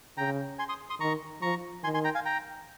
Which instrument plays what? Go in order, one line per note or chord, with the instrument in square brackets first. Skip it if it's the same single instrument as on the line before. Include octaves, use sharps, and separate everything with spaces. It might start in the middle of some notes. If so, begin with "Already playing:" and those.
[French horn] C#3 [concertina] G5 A#5
[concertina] G#5 C6
C6 D#6
C6 D#6
[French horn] D#3 [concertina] A#5 C#6
[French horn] F3 [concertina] A#5 C#6
[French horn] D#3 [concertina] G#5 C6
[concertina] G#5 C6
G5 A#5
F5 G#5
G5 A#5